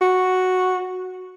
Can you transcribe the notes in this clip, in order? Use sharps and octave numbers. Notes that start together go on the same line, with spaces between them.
F#4